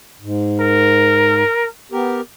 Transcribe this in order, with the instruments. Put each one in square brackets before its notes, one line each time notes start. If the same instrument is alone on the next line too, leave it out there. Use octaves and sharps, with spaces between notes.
[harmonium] G#2
[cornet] A#4
[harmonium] B3 G4 A#4